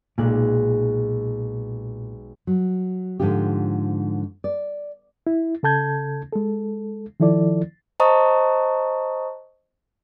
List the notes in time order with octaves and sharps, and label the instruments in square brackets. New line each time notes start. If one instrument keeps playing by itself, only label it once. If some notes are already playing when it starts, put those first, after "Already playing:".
[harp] B1 G#3 F#6 [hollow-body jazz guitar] A#2
[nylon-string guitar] F#3
G#2 D3 F3 F4 G4
D5
[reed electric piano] E4
C#3 A4 A5 G6 G#6
G#3 A4
D#3 F3 E4 A4 D5
[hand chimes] C5 D#5 A5 A#5 C#6 D#6